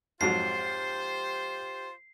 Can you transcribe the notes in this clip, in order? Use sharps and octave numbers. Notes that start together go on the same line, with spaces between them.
F2 G#2 F#3 F4 G4 C5 C7